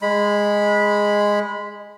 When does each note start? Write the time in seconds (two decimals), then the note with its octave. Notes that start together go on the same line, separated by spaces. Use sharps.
0.02 G#3 B5